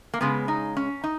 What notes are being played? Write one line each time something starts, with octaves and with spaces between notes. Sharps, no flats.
A#3
C#3 G#3 B3
D#4
C#4
D#4